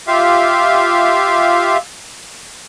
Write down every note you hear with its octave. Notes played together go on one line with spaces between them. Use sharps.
F4 G4 E5 F5